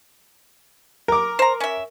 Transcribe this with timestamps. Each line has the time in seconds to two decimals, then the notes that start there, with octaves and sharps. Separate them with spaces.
1.08 A#4 D6
1.39 C5 A#5
1.60 C#4 E5